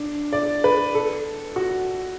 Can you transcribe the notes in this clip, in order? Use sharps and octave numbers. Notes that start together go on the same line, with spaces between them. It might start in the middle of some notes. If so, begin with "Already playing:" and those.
Already playing: D4
D5
B4
A4
F#4